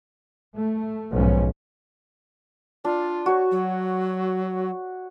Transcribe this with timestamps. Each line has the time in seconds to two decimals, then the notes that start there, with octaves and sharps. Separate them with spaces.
0.57 A3
1.12 B1 G#2 F3 C#4
2.85 D4 F4
3.26 F#4 C#5
3.51 F#3